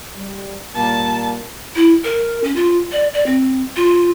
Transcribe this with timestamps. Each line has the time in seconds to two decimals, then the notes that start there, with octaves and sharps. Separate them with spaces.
0.16 G3
0.75 A#2 G3 A#3 A5
1.76 E4
2.04 A#4
2.44 C#4
2.56 F4
2.92 D5
3.14 D5
3.26 C4
3.76 F4